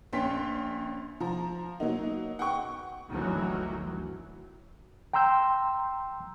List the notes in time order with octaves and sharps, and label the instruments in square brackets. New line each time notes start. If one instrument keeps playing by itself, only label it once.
[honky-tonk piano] A#1 C#4 G5 C6 B6
F3 A#5
F#3 A#3 D#4
F#5 G5 C#6
[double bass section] G1 D2 D#3 E3 F#3
[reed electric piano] G5 A#5 C6 E6 G6